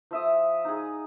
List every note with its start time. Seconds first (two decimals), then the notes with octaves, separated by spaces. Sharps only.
0.11 F3 E5 D#6
0.65 D#4 G#4